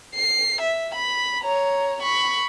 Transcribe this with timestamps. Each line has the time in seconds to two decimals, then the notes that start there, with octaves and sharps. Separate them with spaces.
0.15 C7
0.62 E5
0.95 B5
1.44 C#5 A#5
2.02 B5 C#6